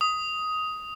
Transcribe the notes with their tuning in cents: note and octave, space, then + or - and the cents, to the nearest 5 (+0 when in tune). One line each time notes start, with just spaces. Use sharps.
D#6 +10